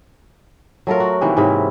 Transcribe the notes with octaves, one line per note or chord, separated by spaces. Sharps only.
F#3 A3 F4 A#4
F#4
C3 D#3 E3 A#3
G#2 C3 C#4 E4